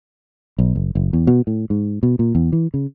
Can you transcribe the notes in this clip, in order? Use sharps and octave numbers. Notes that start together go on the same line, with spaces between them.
B1
F#1
F#1
E2
B2
A2
G#2
B2
A#2
E2
E3
C#3